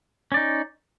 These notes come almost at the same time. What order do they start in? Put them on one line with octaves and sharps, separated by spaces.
C#4 D5 D#4